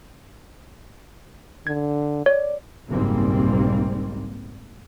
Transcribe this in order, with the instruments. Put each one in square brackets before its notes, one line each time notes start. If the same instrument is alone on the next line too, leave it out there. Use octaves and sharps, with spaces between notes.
[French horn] D3 [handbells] G#6
[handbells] C#5 [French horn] D5
[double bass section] F#1 B1 G#2 G3 A#3 C4